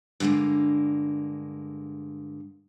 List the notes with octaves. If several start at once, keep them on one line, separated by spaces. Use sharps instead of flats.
G2 D3 E3 G#3 A#3